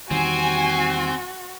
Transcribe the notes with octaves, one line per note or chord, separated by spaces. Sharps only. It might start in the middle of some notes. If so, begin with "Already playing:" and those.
E2 D#3 G3 C4 F#4 G#5